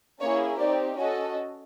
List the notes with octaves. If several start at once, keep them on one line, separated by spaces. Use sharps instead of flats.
A#3 C#4 E4 G#4 C#5
C4 D#4 G4 D5
C#4 F#4 A4 D#5